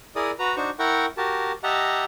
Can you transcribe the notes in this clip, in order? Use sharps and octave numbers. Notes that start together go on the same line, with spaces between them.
E4 G#4 A#4 D5 D#6
F#4 B4 A#5
D4 D#4 F#4 C5 C#6
E4 A#4 F#5 G5 C#6
F#4 G4 A#4 A5
G4 D#5 E5 F#5 A5 A#5